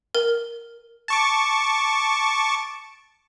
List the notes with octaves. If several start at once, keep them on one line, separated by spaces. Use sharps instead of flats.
A#4
A5 C#6 D6